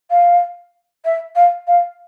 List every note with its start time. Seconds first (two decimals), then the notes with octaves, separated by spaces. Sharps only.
0.10 F5
1.05 E5
1.35 F5
1.67 F5